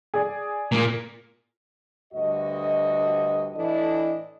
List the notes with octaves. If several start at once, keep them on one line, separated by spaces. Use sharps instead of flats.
G#4 D5
A#2 A#3
D2 G2 F#4 D#5
A2 E3 D4 E4 A4 D#5